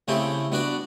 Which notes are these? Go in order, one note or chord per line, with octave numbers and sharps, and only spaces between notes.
C#3 A3 C4 E4 G4
B3 D4 F#4 D5